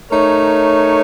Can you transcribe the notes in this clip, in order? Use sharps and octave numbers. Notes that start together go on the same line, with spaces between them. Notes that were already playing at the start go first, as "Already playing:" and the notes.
A3 D#4 A#4 C#5